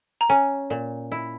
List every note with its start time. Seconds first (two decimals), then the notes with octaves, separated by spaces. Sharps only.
0.21 A#5
0.29 C#4 G#5
0.70 A#2
1.12 E4